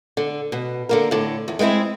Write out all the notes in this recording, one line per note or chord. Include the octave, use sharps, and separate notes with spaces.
D3
B2
D3 A#3 A#4
A2 D3
E2
G#3 B3 C4 E4 G#4